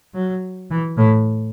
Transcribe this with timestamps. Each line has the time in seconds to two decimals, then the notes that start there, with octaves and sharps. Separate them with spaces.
0.15 F#3
0.71 E3
0.98 A2